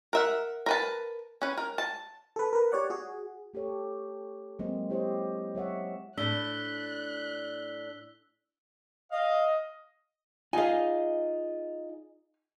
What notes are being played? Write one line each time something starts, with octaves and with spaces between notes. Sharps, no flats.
A#4 E5 F#5
A#4 B4 A5
C#4 B4
A#4
A5
A4 B4
A#4 B4
G4 C#5 D5 F#5
F#4 G#4
A3 G4 A4 C#5
F#3 G#3 A#3 C4 G#4
E4 G4 C5 C#5 D#5
F#3 C#5 E5 F#5
A2 D4 E6 F#6 B6 G7
D#5 F5
D#4 F4 G#4 D#5 F5 G#5